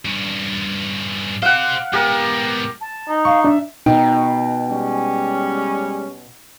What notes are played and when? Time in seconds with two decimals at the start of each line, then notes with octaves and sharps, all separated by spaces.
0.05 G2 C#4
1.42 G4 C5 F5 F#5
1.93 G#2 B3 G4 A#4
2.81 A5
3.08 D#4
3.25 F5 C#6
3.44 D4 E5
3.86 B2 D#4 G5
4.70 G3 G#3 C#4